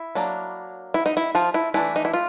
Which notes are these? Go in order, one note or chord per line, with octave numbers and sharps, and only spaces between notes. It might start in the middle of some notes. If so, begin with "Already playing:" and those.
Already playing: E4
F#3 A#3 D4
E4
D#4
E4
F3 F4
E4
E3 A3 D4 E4
D#4
E4
F4